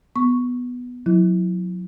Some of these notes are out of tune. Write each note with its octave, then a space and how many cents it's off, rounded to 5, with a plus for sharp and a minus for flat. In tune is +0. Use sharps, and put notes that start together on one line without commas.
B3 +0 C#6 +0
F#3 -35 E4 +0